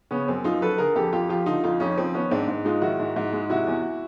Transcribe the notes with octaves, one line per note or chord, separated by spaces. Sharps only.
C#3 B3 C#4
F#2 C4
F#2 D#4 F4
F#3 A4 B4
D3 G#4 A#4
F2 G4 A4
F2 F4 G4
F3 F4 G4
D3 D#4 F4
F2 D#4 F4
F2 C#4 D#4
F3 C4
D#3 B3 C#4
G#2 C4 D4
G#2
G#3 D#4 F4
D#3 E4 F#4
G#2
G#2
G#3
C3 E4 F#4
E2